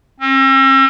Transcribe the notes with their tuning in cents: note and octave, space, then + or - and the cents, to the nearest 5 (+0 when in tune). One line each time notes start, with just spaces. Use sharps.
C4 +45